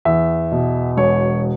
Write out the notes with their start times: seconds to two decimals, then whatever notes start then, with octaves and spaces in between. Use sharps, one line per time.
0.05 E2 E5
0.52 B2
0.97 E1 C#5